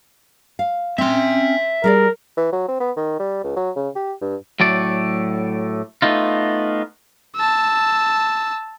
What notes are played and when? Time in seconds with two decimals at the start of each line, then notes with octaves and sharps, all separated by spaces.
0.59 F5
0.98 C4 C#4 E5 C6
1.84 G3 G#4 A#4 D5
2.37 E3
2.53 F#3
2.68 C4
2.81 B3
2.97 D#3
3.20 G3
3.44 C#2
3.56 F#3
3.76 C#3
3.96 G4
4.21 G2
4.60 A2 F#3 A3 D5
6.02 A3 B3 D#4 F4
7.36 A5 E6